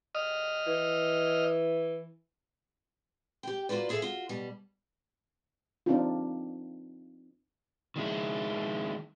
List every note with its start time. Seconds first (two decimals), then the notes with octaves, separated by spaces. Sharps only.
0.15 D#5 F6
0.67 E3
3.43 G4 G5
3.69 A#3 F4 F#4 B4 D5
3.89 E4 G#4 A4 B4 E5 F5
4.02 F4 F#4
4.29 B2 G3
5.86 C4 D4 D#4 F4
7.96 D#3 G#3 E4